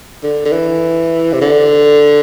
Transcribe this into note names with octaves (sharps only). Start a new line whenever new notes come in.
D3
D3
E3
C3
D3